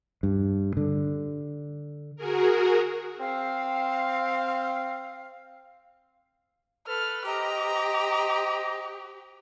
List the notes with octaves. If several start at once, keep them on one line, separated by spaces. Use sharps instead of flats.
G2
D3
F#4 G#4 A#4
C4 F5
A4 B4 F6
G4 C5 D#5 A#5